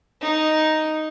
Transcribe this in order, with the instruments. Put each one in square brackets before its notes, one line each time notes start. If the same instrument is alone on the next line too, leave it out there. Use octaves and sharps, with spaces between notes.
[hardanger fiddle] D#4